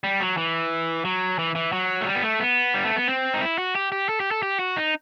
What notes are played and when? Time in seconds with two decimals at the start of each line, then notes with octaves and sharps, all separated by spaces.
0.04 G3
0.20 F#3
0.37 E3
1.05 F#3
1.39 E3
1.55 E3
1.72 F#3
2.01 A3
2.07 G3
2.15 B3
2.23 A3
2.40 B3
2.74 G3
2.85 A3
2.96 B3
3.08 C4
3.34 D#4
3.41 E4
3.58 F#4
3.75 G4
3.92 G4
4.09 A4
4.20 G4
4.31 A4
4.43 G4
4.59 F#4
4.76 D#4